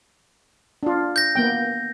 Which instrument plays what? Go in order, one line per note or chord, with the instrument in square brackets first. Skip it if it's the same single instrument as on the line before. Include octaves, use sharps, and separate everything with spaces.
[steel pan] D4 F4
[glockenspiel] G6 A#6
[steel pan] A#3 B3 G5